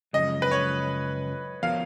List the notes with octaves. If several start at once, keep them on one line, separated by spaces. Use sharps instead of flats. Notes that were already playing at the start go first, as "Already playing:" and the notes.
F#2 C#3 F3 G#3 C#4 D#5
B4
C#5
F3 B3 F#4 A#4 C#5 F5